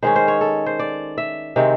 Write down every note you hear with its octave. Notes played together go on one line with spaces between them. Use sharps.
D#3 G#3 C#4 C5
C5
C#5
A4
C5
D5
E5
C3 D#3 G#3 C4